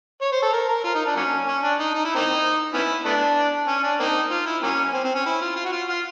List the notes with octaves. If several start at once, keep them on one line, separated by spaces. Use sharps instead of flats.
C#5
C5
A4
A#4
A#4
F4
D#4
D4
F#3 A#3 C#4
C#4
D4
D#4
D#4
E4
A#3 C4 D#4
B3 C#4 E4
A3 B3 D4
C#4
D4
A#3 C4 D#4
F4
E4
F#3 A#3 C#4
C4
C4
C#4
E4
F4
F4
F#4
F4
F4